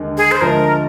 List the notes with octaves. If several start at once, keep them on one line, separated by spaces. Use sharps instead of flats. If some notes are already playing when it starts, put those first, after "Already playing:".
Already playing: D#2 D3 G#3
G#4
C5
D2 D3 F3 G#3 A#4